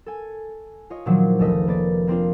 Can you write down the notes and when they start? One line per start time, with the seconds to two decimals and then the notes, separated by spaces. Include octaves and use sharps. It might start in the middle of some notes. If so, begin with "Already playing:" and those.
0.06 A4 G#5
0.90 F4 C#5 D#5
1.06 A#2 D#3 F3 F#3 D4
1.39 F1 C#2 A3 A4 D#5 B6
1.67 A#3 B4 D5 A6
2.07 A#3 C4 D4 F4